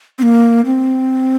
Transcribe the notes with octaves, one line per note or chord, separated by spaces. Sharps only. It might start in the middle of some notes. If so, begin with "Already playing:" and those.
C4
A#3
C4